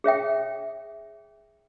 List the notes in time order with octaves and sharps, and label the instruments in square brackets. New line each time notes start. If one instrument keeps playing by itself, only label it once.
[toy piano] G#4 C#5 E5 G5